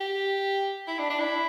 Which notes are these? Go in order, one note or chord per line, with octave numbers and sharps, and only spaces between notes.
G4
E4
D4
D4
E4